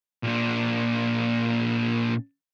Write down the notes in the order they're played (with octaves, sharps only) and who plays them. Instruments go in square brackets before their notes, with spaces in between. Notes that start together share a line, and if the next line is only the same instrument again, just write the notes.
[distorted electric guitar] A#2 D4